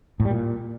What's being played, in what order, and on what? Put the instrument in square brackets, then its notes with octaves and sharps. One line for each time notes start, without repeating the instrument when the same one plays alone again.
[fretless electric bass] A2
G3
A#2